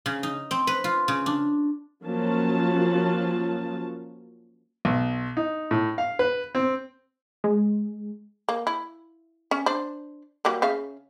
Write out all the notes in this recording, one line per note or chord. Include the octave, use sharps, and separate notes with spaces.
C#3
D#4
C4
B4
F4
C#3
D4
F3 F#3 A#3 C#4 A5
B1
D#4
A2
F5
B4
C4
G#3
A#3
E4
C#4
D4 C5
F#3 G3 A#3
C#3 E5 F5